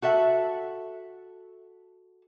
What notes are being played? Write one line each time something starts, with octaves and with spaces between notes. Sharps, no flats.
F#4 A4 E5 F#5